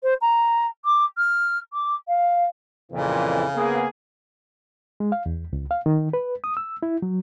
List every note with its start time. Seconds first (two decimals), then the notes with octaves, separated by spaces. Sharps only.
0.03 C5
0.21 A#5
0.85 D6
1.17 F6
1.73 D6
2.08 F5
2.92 F2 A#2 C#3 E3
3.54 A#3 B3 G#4
5.00 G#3
5.12 F5
5.26 E2
5.53 C#2
5.71 F5
5.86 D#3
6.13 B4
6.44 D#6
6.57 E6
6.83 E4
7.02 F#3